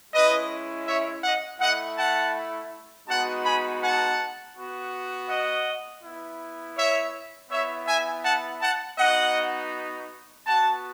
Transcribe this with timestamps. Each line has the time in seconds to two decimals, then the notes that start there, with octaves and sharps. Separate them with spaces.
0.13 G#3 C#4 E4 B4 D#5
0.87 C#5 E5
1.24 D#5 F#5
1.60 A3 E4 D#5 F#5
1.98 F#5 A5
3.08 G#3 B3 D#4 F#4 F#5 A5
3.45 G#5 B5
3.82 F#5 A5
4.56 B3 F#4
5.29 D#5 F#5
6.03 B3 E4
6.78 C#5 E5
7.50 B3 E4 C#5 E5
7.87 E5 G#5
8.24 F#5 A5
8.61 F#5 A5
8.98 B3 D#4 F#4 D#5 F#5
10.46 B3 F#4 F#5 A5